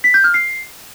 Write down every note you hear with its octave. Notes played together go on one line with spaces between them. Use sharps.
B6
G6
F6
C7